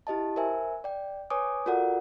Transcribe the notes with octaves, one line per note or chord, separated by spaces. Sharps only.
E4 G4 D#5 A5
A#4 C5 E5 G#5
D5 G5
B4 C#5 G#5 D6 D#6
F4 F#4 A4 A#4 D5 F#5